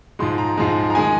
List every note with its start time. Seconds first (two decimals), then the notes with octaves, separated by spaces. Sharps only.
0.19 G#2 F3 G#3 C6
0.38 A#5
0.57 G#2 F3 G#3
0.90 A#5
0.95 D#3 G#3 G#5